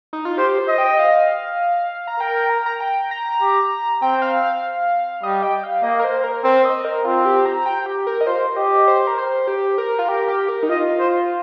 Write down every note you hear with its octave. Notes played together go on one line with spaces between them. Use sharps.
D#4
F4
G4 C5
C5
D#5
G5
F5
A#5
A#4 G5
A#5
A#5
G5
A#5
G4
C4 G5
F5
F5
G3 D#5
G5
F5
A#3 D#5
A#4
C5
A#4
C4 C5
D#5
A#4
C4 F4
G4
A#5
G5
G4
A#4
D#5
F4 C5
G4 D#5
C5
A#4
C5
G4
A#4
F4
G4 A#4
G4
A#4
D#4
F4 D#5
C5